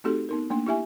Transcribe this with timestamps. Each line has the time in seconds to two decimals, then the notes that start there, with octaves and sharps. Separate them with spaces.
0.04 A3 C4 D#4 F#4 G4 A4
0.29 B3 D#4 A#4
0.50 A3 A#3 D4
0.67 E4 G4 E5 G#5